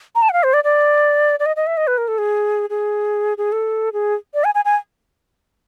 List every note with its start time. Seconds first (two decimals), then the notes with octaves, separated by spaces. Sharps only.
0.15 A#5
0.22 A5
0.29 F#5
0.33 F5
0.43 C5
0.54 D5
0.64 D5
1.40 D5
1.46 D#5
1.56 D#5
1.67 E5
1.77 D#5
1.87 B4
1.98 A#4
2.08 A4
2.18 G#4
2.70 G#4
3.38 G#4
3.52 A4
3.93 G#4
4.34 D5
4.44 G#5
4.55 G#5
4.65 G#5